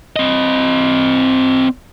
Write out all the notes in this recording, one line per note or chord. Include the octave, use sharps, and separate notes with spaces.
C4 D#5